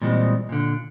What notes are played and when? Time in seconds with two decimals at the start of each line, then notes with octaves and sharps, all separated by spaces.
0.02 A#2 E3 G3 G#3 B3 C4
0.49 A#2 D3